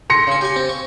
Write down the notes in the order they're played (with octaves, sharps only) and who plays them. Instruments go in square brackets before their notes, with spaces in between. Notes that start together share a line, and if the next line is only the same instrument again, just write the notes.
[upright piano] C6 A#6 C#7
[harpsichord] C#3 G#5
G4 G#5
C4
C#6